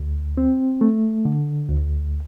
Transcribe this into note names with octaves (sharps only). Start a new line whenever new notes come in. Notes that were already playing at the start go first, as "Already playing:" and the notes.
Already playing: D2
C4
A3
D3
D2